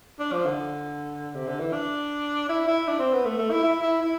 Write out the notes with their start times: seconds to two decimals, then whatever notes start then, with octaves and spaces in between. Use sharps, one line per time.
0.20 D4
0.32 F3
0.46 D3
1.34 C3
1.47 D3
1.60 E3
1.73 D4
2.49 E4
2.67 E4
2.87 D4
2.99 C4
3.13 B3
3.25 A3
3.38 A3
3.51 E4
3.63 E4
3.82 E4
4.02 E4